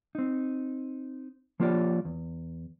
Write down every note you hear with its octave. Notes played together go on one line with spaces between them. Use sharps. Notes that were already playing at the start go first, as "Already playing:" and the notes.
C4 D#4
F3 A#3 F4 G4 C#5 D5
E2